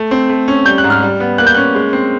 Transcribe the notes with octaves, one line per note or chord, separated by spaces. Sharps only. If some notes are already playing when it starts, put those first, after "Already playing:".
Already playing: A3
C4
A3
C#4
G3 G6
F#6
G#2
F6
G3
B3
A#3 F#6
G6
C#4 F#6
G#3
C4